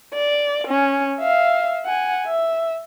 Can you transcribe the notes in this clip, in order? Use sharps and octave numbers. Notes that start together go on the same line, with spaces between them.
D5
C#4
E5 F5
F#5 G#5
E5